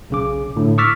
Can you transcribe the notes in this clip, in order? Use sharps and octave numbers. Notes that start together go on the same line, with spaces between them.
B1 C#3 D6
A2 D3
C#6 D6 E6 F6 A6 B6